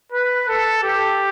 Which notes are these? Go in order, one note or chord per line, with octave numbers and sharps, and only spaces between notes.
B4
A4
G4